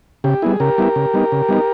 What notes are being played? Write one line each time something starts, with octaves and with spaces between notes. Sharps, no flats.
C#3 G4
G3 B3 E4 G#4
C#3 G4 A#4
G3 B3 E4
C#3
G3 B3 D#4
C#3
G3 B3 D#4